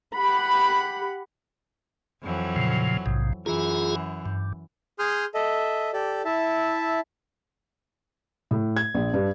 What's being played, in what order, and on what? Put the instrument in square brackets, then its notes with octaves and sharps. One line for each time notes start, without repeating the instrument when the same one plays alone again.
[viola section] G4 F#5 B5
[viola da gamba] F2 E3 F#3
[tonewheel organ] A#2 C#3 F3
A#1 G#2 C3
[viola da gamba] F#2 E3 [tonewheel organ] F4 G#4 A#5
[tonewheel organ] G2
[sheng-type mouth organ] G#4 C6 D#6 F6 G6
A4 D#5 E5
G4 A4 D5
E4 E5 A5
[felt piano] A2
G#6
A#1
G2